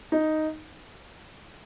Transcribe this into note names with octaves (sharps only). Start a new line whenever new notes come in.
D#4